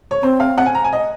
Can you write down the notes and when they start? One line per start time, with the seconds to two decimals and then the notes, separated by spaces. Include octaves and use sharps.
0.11 C#5
0.22 C4 C5
0.40 F5
0.58 F#5
0.66 G#5
0.75 A#5
0.84 G#5
0.93 D#5